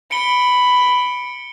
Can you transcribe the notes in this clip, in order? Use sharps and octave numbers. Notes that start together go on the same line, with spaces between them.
B5 C#7 D7 G7